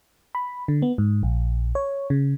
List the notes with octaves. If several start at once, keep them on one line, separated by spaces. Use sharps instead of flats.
B5
D3
B3
G#2
A#1
C#5
C#3